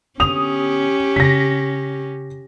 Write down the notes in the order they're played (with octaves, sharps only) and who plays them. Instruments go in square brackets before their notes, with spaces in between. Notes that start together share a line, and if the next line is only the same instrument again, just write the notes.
[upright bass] D3 B3 [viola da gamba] C#4 G4 [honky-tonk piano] D#6 F7
[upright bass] C#3 [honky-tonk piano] A#6 B6